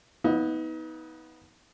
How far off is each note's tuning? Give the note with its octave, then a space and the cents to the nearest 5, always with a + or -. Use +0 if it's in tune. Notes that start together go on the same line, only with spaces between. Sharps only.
B3 +0 D#4 +35 F5 +0